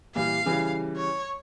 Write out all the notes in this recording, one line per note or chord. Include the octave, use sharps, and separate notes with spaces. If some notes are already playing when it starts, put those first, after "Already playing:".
A#2 E3 G3 F5
C#3 E3 G3
C#5